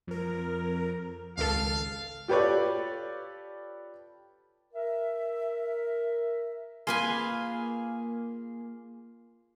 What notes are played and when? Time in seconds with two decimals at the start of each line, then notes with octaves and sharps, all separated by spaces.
0.07 F2 A#4
1.37 G#1 C#2 A4 F5
2.28 F4 G4 A4 B4 C#5 D5
4.74 A#4 E5
6.87 A#3 F4 G#4 B4 G#5